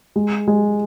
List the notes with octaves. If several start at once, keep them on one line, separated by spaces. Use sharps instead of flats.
G#3
G#3